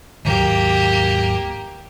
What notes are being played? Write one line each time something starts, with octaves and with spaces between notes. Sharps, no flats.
G#1 D#2 F#3 A#3 G4